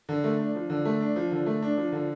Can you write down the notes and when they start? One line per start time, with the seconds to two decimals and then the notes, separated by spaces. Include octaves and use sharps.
0.09 D3
0.24 A3
0.39 D4
0.55 F3
0.70 D3
0.85 A3
1.01 D4
1.16 F3
1.32 D3
1.46 A3
1.62 D4
1.77 F3
1.92 D3